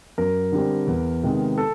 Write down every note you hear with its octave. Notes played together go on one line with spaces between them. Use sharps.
F#2 A#4
D3 G3 C4
E2
C3 D#3 G#3 B3
A4